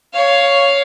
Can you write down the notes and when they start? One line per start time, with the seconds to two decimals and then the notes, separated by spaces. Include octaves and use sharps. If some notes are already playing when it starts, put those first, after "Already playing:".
0.13 C#5 F5